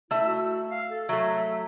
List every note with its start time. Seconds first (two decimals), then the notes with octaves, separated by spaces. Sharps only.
0.11 A3 E4 E5
0.26 F#4
0.70 F5
0.90 A4
1.09 F#3 A3 E5